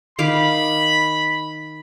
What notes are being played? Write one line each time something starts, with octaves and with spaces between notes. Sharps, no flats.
D#3 F5 B5 D6